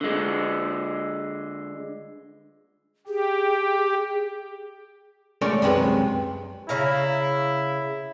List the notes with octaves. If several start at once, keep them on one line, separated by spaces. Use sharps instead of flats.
D3 G#3
G4 G#4
G#3 A3 C#4 A#4 D5
C2 F#2 C3 G#3 B4
C#3 E4 F5 A#5